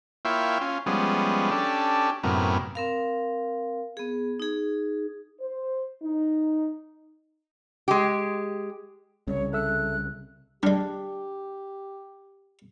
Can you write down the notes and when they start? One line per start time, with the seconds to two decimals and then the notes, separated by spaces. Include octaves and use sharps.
0.25 A#3 E4 F4 C#5 E5 G5
0.61 C#4 F4
0.86 F3 G3 G#3 B3 C#4
1.51 C#4 D4 G4 A4
2.23 F#2 A2 C3 B3 A#4
2.75 C4 A#4 F5
3.97 B3 G#4
4.40 D#4 G#4
5.41 C5
6.03 D#4
7.88 G#3 G4
9.27 C2 C#3 C#5
9.53 A4 E5 E6 F#6
10.63 G3 G#3 D4 G4